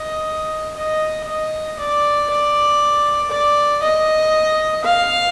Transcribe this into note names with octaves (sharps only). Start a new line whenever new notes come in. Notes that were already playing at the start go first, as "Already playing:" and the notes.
Already playing: D#5
D#5
D#5
D5
D5
D5
D#5
F5